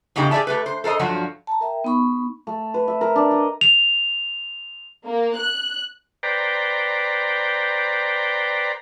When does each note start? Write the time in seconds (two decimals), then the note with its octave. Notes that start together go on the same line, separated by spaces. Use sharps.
0.16 E2 A2 C#3 D#4 G4
0.31 G4 G#4 C#5 D5 E5 A5
0.47 A3 G4 B4
0.66 C5
0.84 A4 A#4 C5 D#5
0.99 G2 F3 F#3 F#4
1.47 A5 A#5
1.61 A#4 E5 G5
1.84 B3 D#4 B5 C#6
2.47 A3
2.74 B4
2.88 E5
3.01 A#4
3.16 D4
3.31 D#5
3.61 F7
5.06 A#3
5.39 F#6
6.23 B4 C5 D5 G5 A#5